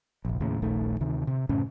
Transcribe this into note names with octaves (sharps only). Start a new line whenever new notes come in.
F1 A#1
D#2 A2 C#3
D#1 A#1 D#3 A3
D2 C3 D#3
C3
F#2 A2 C#3 C#4